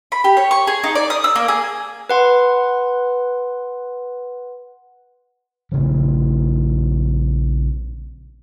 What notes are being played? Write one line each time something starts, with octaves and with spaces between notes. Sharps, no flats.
B5
G4
C#5
C#6
G#4
D#4
D5
D#6
E6
A#3
G#4
B4 F#5 C6
A#1 C#3 F3